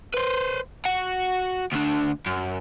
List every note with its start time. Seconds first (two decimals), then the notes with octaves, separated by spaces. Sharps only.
0.14 B4 C5
0.85 F#4 F#5
1.72 D2 D4
2.26 F#2